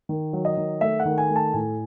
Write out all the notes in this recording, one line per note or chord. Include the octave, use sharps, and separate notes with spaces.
D#3
F#3
D#5
D#3
A3 E5
F#5
D#3
G#5
A3
A5
A2 G#5